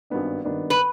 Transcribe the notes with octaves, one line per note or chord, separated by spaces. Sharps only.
G#1 G2 D#3 B3 D4
G#1 G2 D#3 B3 D4
B4